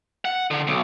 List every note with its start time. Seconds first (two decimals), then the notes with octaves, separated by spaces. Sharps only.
0.25 F#5
0.51 D3
0.67 B1